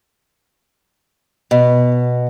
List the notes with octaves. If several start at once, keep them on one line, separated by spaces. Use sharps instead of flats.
B2